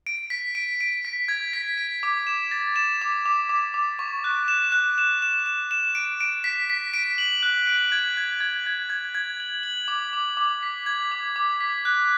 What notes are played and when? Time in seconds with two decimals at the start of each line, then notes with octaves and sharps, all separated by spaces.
0.07 D7
0.30 B6
0.55 D7
0.81 D7
1.05 B6
1.28 G#6
1.53 B6
1.78 D7
2.03 D6
2.27 E7
2.51 A6
2.76 E7
3.02 D6
3.26 D6
3.49 D6
3.74 D6
3.99 C#6
4.24 F#6
4.48 E7
4.72 F#6
4.98 E7
5.22 E7
5.46 E7
5.71 E7
5.95 D7
6.21 D7
6.44 B6
6.70 B6
6.94 D7
7.18 F#7
7.43 F#6
7.67 D7
7.92 G#6
8.17 G#6
8.41 G#6
8.66 G#6
8.90 G#6
9.15 G#6
9.40 F#7
9.63 F#7
9.88 D6
10.13 D6
10.37 D6
10.63 B6
10.86 G#6
11.11 D6
11.36 D6
11.61 B6
11.85 F#6